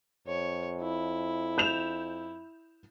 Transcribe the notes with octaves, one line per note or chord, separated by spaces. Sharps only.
F2 C#5
E4
G6 E7 F7